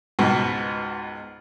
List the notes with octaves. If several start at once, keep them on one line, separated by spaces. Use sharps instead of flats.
C#2 G#2 B2